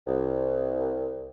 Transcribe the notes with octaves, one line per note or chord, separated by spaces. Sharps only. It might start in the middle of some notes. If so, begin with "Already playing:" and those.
C2